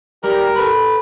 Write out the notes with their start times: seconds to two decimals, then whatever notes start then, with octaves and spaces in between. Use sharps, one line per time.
0.24 G3 G4 A#4
0.56 A4 B4